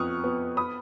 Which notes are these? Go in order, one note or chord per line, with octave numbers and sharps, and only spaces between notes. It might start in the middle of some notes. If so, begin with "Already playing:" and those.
Already playing: F2 B3 C#6 D#6 F6 F#6
B3
B5 D#6